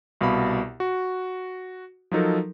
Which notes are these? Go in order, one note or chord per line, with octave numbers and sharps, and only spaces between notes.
C2 B2 F5 B5
F#4
F3 F#3 D#4 A4 A#4